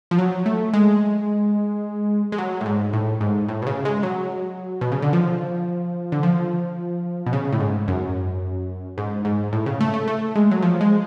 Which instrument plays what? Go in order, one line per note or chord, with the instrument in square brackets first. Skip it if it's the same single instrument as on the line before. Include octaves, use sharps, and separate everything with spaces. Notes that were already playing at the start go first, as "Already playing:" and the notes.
[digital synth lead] F3
F#3
A3
G#3
G#3
F#3
A2
G#2
A2
G#2
A2
B2
C#3
G#3
F#3
B2
C#3
D3
F3
D3
F3
B2
C#3
A2
G#2
F#2
G#2
G#2
A2
C#3
A3
A3
A3
G#3
F#3
F3
G#3